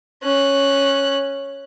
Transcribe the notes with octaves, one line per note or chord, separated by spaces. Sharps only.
C#4 F#6